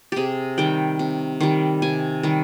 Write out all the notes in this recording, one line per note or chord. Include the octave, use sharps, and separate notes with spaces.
C3 G4 G#4
D#3 G3 G5
C3
D#3 G3
C3 G#5
D#3 G3